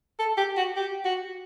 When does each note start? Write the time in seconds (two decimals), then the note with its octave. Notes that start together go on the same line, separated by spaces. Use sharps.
0.19 A4
0.37 G4
0.57 F#4
0.77 G4
1.05 F#4